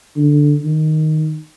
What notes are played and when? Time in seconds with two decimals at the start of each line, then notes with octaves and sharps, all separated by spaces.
0.16 D3
0.64 D#3